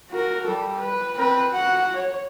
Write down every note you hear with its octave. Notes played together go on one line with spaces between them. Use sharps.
F#4 A#4
G3 A4
B4
C4 B4
F#4 F#5
C#5